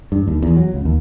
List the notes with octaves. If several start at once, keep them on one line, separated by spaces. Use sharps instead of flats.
G2
D#2
E2
F#3
C#2
D#2